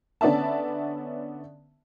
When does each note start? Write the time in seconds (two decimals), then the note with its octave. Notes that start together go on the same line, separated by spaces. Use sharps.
0.21 D3 B3 C#4 D5 E5 A5